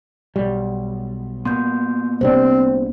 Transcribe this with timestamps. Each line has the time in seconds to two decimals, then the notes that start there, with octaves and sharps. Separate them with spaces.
0.36 B1 G3
1.45 A#2 A#3 B3 C6 G6
2.21 C2 C3 C4 D4 C5